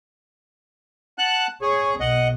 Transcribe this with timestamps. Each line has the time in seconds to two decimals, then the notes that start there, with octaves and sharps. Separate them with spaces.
1.18 F#5 A5 F#6
1.62 G#4 C#5
2.00 B1 D#5 F#5